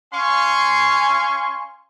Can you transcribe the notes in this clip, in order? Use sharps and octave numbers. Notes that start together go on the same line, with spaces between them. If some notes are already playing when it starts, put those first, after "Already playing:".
C#4 F5 G#5 C6 C#6